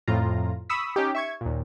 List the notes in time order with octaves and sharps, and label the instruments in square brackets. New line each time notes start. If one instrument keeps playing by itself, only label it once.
[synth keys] F2 A2 F4 A#5
B5 C#6 D#6 E6 B6
C#4 D#4 G4
E5 C#6 G#6
D#2 A#2